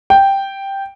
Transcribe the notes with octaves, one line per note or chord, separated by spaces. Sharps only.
G5